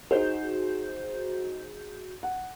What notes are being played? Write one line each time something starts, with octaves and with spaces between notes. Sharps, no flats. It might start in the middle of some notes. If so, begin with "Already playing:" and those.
D#4 F#4 G#4 C5 G6
F#5